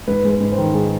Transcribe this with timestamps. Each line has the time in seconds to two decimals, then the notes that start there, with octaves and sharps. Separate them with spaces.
0.08 G#2 B4
0.25 G#3
0.30 B4
0.40 G#2
0.52 C5
0.58 D#3
0.74 G#2 G#4